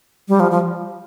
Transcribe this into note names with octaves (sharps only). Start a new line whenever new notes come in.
G3
F3
F3